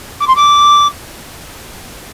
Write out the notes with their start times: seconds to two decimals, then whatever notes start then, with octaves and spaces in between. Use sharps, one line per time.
0.20 D6
0.28 C6
0.36 D6